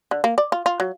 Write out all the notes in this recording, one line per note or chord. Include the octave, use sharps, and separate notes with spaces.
D3
A#3
D5
F4
F4
F#3